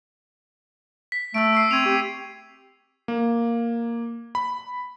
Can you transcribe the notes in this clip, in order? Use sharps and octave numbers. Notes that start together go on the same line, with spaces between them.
B6
A3 E6 D7
C#6 E6 C7
C4 G#6 D#7 F7
G4
A#3
B5